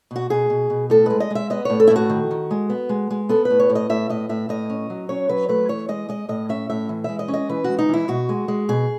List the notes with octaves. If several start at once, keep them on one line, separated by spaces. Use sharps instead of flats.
B2 F#4
B2 G#4
B2
B2
A2 A4
G#3 B4
D#5
G#3 E5
B3 D#5
A2 C#5
A4
E4
A2
F#4
D#3
D#3
G#3
B3
G#3
G#3
B3 A4
B4
A2
C#5
A2
D#5
A2 E5
A2 D#5
A2 E5
A2 D#5
C#4
F#3
C#4 C#5
F#3 B4
A3 B4
E3 C#5
G#3 D#5
G#3 D#5
A2 D#5
C#4 E5
A2 E5
E3
G#3 E5
D#5
C#4
D#5
E3 B4
G#3 F#4
D#4
E3 E4
B2 F#4
G#3
G#3
B2 G#4